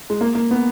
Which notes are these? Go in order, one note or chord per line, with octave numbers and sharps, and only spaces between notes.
G#3
A#3
A#3
B3